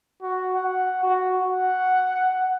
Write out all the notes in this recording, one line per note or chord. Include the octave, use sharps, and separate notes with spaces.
F#4
F#5
F#4
F#5